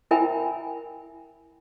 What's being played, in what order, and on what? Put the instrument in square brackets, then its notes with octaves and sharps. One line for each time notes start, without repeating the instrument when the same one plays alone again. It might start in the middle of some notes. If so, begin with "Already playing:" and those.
[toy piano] E4 A#4 E5 G5 G#5 B5